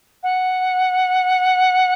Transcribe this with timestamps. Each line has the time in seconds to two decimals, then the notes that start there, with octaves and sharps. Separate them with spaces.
0.23 F#5